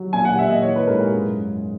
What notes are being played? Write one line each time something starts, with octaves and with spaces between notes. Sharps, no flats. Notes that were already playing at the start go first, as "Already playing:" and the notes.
Already playing: F#3
A#2 G#5
F#5
A#2 E5
D#5
E3 C#5
B4
G#2 A#4
G#4
F#2